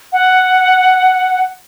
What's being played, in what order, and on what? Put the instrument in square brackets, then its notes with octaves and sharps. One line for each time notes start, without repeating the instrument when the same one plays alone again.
[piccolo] F#5